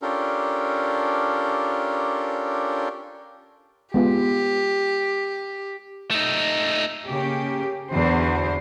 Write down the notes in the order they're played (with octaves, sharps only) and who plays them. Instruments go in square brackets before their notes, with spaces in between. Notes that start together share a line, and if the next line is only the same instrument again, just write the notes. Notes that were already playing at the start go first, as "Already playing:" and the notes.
[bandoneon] C#4 D4 F4 G4 A4 A#4
[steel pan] G#3 B3 F4 [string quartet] G4
[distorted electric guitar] A3 D#4
[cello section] C#3 A#3 G4
E2 D3 F#4 C5